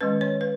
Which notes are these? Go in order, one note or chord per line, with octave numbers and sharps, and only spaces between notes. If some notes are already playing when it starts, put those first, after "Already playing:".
D#3 G#3 C#4 B4
C#5
B4